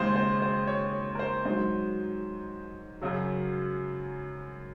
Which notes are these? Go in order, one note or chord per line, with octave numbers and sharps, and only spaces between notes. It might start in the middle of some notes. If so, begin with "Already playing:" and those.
Already playing: D#2 C#3 G#3 C5
C5
C5
C#5
A#4
C5
G#2 F#3 C5
F#2 C#3 F#3